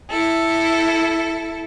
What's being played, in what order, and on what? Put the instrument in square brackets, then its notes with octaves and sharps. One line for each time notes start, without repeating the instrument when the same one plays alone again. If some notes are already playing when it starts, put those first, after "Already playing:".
[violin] E4 A4